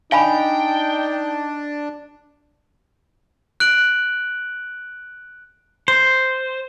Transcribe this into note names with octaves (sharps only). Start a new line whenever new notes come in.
D4 D#4 F5 G5 G#5 B5
F#6 D7 F#7
C5